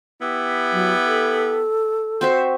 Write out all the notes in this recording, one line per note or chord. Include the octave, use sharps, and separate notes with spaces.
B3 E4 G4
F#3
A4
C4 F#4 C5 E5